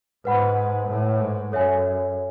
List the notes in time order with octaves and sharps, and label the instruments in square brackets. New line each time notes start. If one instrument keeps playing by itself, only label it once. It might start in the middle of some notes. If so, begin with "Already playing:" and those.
[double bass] G#2 [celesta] B4 F#5 B5
[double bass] A2
G#2
[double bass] F#2 [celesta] A4 C#5 E5 G#5